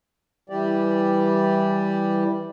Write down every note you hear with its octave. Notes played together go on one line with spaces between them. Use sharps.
E3 G3 G4 D5